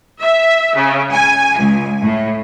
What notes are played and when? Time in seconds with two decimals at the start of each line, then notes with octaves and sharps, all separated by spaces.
0.21 E5
0.76 C#3
1.12 G#5
1.58 C#2
2.03 A2